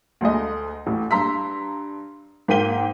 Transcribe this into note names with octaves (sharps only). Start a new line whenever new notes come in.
D2 G#3 A3 D#5
A1 A2
G2 A#5 C6 E6 B6
G#2 A#3 G5 B6 D#7 G7